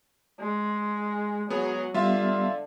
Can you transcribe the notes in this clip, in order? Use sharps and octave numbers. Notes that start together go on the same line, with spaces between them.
G#3
F#3 B3 G#4
D3 G3 B3 F4 E5